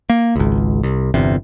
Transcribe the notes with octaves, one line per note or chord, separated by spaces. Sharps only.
A#3
G#1 C#2
C2
G1 E2 C3